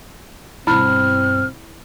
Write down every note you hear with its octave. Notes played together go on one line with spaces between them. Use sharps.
G2 B2 C4 E4 B5 F6